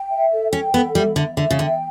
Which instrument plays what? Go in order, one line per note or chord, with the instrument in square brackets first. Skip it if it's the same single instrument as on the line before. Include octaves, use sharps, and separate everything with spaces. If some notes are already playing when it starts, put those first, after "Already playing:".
Already playing: [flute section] G5
E5
A4
[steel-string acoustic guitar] C#4 [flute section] G5
[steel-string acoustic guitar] B3 [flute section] A4
[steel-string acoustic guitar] G3 [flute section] E5
[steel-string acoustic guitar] D3 [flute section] E5
[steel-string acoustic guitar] D3 [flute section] E5
[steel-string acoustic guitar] C#3
[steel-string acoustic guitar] D3 [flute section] G5